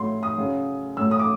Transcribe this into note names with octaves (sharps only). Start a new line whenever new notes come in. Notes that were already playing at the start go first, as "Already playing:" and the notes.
Already playing: A2 F#3 C6
D#6
C#3 F#3
A2 F#3 E6
D#6
D6